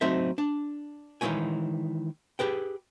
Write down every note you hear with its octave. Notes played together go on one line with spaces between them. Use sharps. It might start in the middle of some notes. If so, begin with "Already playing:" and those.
F#3 A3 C4 D#4 C5 E5
D4
D#3 E3 G#3 C4 C#5 G#5
G4 G#4 B4 G5